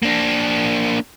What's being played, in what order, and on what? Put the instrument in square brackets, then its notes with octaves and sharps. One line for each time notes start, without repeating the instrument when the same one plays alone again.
[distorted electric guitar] A#3 D4